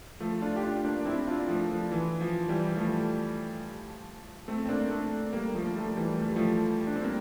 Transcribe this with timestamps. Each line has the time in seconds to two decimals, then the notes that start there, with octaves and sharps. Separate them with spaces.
0.20 F3 A3
0.42 D4 F4
0.56 G4
0.63 D4 F4
0.85 A#3 D4
0.99 D4
1.06 C4 E4
1.27 D4 F4
1.48 F3 A3
1.71 F3
1.91 E3
2.21 F3
2.49 E3 G3
2.76 F3 A3
4.48 A3 C4
4.66 C4
4.69 A#3 D4
4.90 A3 C4
5.33 G3 A#3
5.54 F3 A3
5.76 F3 A3
5.97 E3 G3
6.18 A3
6.27 G3
6.36 F3 A3
6.87 D4
6.96 C4
7.03 G3 A#3